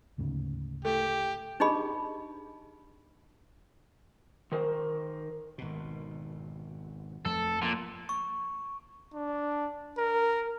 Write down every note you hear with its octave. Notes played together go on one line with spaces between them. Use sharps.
D2 G#2 C#3
A3 G4
D4 D#4 G4 G#4 D#5 B5
D#3 A#4 C5
G#1 B2
F2 F3 A3 A4
F2 A#2 F3 A#3
C#6
D4
A#4